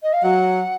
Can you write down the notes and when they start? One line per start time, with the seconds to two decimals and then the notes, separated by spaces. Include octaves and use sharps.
0.02 D#5
0.12 F5
0.23 F#3 F#5